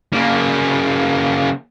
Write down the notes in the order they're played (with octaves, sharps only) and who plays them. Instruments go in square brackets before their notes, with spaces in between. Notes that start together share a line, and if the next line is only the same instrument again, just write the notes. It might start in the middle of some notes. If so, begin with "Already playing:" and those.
[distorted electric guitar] C#3 A#3